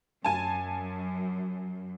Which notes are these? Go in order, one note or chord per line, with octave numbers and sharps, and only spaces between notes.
F#2 G#5 A5